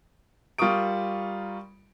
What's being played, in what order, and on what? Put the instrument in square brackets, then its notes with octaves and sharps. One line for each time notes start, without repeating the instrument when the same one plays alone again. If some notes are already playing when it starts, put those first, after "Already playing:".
[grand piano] G3 F4 A#4 C#6 D#6 D7